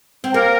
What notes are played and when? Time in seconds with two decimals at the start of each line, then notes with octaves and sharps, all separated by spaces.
0.24 C4
0.34 A#3 A#4